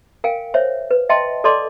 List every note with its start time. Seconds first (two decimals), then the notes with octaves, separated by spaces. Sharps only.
0.24 A#4 F5 G5 G#5
0.54 C5 C#5 E5
0.91 B4
1.09 D#5 E5 G5 A5 C6
1.44 A4 D5 D#5 A5 C6 D6